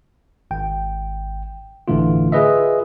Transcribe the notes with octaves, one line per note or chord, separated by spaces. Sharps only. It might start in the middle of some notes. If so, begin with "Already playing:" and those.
G#1 G5
G1 A2 D3 E3 A3 F4
F4 G#4 B4 D#5 E5